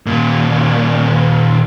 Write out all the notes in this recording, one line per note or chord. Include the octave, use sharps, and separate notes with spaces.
D#2 A#2